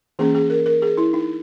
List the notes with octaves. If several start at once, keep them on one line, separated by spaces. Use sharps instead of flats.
E3 A#3 C#4 G#4
G#4
A#4
A#4
G#4
E4
D#4